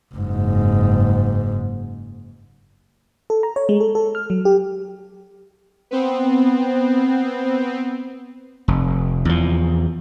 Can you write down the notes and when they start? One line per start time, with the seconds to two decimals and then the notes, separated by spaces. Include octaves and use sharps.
0.15 F#1 G#2
3.30 A4
3.43 A#5
3.56 C#5
3.69 G#3
3.80 A4
3.95 A4
4.15 F6
4.30 F#3
4.45 G4
5.91 B3 C4
8.68 F1
9.25 E2 F3